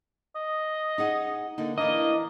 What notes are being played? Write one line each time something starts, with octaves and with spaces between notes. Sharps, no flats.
D#5
D#4 G#4 F#5
D3 A#3 D#4
E3 A#3 D4 D#5